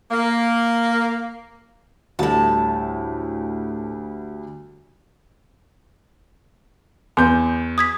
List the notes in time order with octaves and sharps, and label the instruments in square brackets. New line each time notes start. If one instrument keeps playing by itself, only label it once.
[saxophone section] A#3
[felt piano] D2 G3 [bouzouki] A2 A5
[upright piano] E2 G6 [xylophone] C6
[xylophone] D#6 G#6 B6